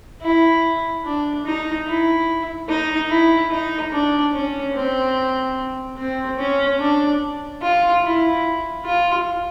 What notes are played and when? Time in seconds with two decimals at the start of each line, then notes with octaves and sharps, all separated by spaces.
0.22 E4
1.04 D4
1.45 D#4
1.86 E4
2.69 D#4
3.10 E4
3.51 D#4
3.92 D4
4.33 C#4
4.74 C4
5.97 C4
6.38 C#4
6.79 D4
7.62 F4
8.03 E4
8.85 F4